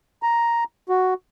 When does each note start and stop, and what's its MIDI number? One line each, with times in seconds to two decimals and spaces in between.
0.23 0.64 82
0.89 1.14 66